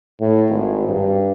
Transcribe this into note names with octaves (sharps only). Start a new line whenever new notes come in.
A2
G#1
G2